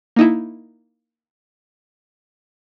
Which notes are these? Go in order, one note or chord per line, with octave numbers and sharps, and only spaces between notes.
A#3 D#4 E4